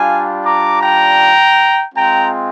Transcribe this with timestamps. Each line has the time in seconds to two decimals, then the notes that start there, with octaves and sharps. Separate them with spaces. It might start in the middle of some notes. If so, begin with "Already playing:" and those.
Already playing: G3 D4 F4 F5 G#5
0.44 A#5 D6
0.81 G5 A#5
1.95 G#3 C4 F4 G5 A#5